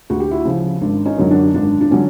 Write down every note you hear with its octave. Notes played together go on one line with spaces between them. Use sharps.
D2 F#4
G4
E4 F#4
C#3 F3
G#1 D4
C#4 D#4
F#2 D3 F#3
D4
G#1 D4
D4
D3 F#3 C#4